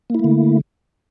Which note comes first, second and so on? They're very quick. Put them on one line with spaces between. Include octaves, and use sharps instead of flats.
A#3 E4 A3 D3